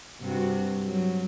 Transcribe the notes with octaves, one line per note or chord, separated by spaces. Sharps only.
G2 C3 F#4
F#3